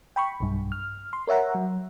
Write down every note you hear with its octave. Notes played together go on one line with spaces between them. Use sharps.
G5 B5 C#6
B1 G2
F6
C6
A#4 C#5 E5 F#5 A#5
F#3